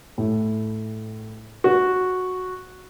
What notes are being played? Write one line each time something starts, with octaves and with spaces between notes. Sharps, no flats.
A2
F#4